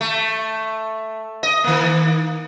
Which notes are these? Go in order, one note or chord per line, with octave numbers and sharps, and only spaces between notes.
A3
D#5
D#3 A#3